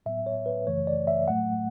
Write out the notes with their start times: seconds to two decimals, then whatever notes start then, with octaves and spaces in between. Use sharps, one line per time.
0.06 A2 F#3 B3 E5
0.26 C#5
0.46 B4
0.66 G#1 F#2 C#3 E3 A3 C#5
0.87 D5
1.07 E5
1.28 A2 F#3 A3 F#5